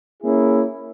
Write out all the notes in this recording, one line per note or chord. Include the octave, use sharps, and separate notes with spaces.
A#3 C#4 E4 G#4